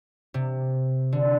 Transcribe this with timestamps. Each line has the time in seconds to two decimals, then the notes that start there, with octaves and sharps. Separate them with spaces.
0.34 C3
1.13 D3